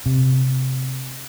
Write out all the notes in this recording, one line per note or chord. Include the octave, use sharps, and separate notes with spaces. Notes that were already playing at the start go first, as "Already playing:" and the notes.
C3